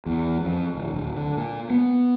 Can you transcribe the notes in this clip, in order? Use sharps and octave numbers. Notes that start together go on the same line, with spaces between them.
E2
F2
D1
D1
D3
A#2
B3